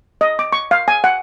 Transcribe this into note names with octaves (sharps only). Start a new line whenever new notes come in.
D#5
D6
C#6
F5
G#5
F#5